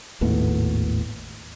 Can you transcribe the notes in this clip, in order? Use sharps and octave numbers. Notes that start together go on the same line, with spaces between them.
G#1 D#2 A2 B3